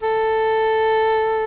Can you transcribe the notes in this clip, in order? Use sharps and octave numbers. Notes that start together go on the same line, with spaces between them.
A4